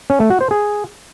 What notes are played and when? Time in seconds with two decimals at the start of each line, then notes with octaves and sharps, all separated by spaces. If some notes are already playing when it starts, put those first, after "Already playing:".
0.10 C#4
0.20 A3
0.30 F#4
0.41 C5
0.51 G#4